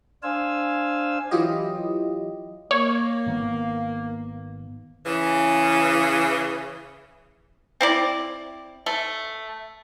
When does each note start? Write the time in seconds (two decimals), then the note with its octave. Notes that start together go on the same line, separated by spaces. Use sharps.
0.23 D4 C5 F5 G#5 E6
1.31 E3 F#3 E4 F4 G4 D#5
2.71 A#3 C#5
3.26 G#1 D#3 B3
5.05 C#3 E3
7.81 C4 E4 D5
8.86 A3